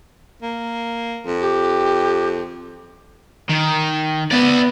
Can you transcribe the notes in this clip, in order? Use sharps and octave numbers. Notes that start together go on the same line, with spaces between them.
A#3
F2
G4
D#3
B3 D5 E5